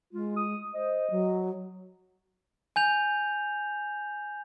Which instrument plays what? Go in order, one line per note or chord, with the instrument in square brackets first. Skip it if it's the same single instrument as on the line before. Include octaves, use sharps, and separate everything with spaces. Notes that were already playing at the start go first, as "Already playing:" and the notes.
[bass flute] G#3 [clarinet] F4
[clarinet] D#6
[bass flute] C5 [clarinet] D#5
[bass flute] F#3
[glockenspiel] G#5 G6 F7